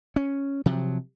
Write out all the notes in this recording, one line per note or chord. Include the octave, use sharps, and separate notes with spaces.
C#4
C3 F3 F#3